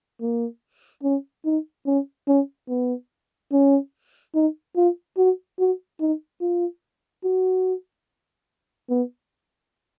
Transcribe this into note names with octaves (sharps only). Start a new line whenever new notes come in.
A#3
C#4
D#4
C#4
C#4
B3
C#4
D#4
F4
F#4
F#4
D#4
F4
F#4
B3